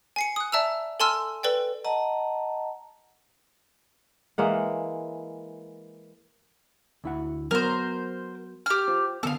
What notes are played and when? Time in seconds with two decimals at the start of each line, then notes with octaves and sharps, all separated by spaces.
0.16 G#5 C7 C#7
0.36 D#6 F#6
0.52 D5 E5 A5 A#5 E6
1.00 A4 G#5 A5 C6 E6 F6
1.43 A4 B4 D5 G5
1.85 D#5 F#5 A5 A#5
4.38 E3 G#3 A#3 F#5
7.04 D2 E4 F#5
7.51 F#3 B3 A#4 C5
8.66 G4 F6
8.88 F4 C5
9.23 D3 B3 A4 F5